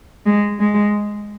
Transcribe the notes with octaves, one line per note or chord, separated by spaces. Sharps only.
G#3
G#3